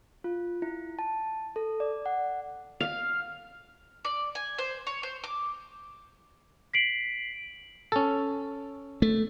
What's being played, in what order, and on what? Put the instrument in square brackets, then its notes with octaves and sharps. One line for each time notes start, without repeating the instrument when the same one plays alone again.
[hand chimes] F4
E4
A5
A4
D5
F#5
[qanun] F5
[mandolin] D5
G#5
C5
C#5
C5
D6
[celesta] B6 C7 D7 F#7
[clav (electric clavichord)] C#4 A4
[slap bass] A3